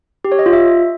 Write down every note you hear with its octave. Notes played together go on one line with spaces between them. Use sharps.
G4
C#5
D#5
F4
E5